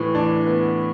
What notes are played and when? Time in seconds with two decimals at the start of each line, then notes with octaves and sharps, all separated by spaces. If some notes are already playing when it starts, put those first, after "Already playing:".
Already playing: A2 E3
0.15 D4
0.47 B3